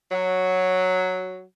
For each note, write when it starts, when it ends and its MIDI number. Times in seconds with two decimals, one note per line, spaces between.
0.12 1.42 54